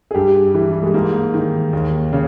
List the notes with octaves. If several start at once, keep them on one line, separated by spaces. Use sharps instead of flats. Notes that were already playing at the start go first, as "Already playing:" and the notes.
G#4
G2 G4
E3
G3
G#3
G#2 A#3
D#3
D#2
C#3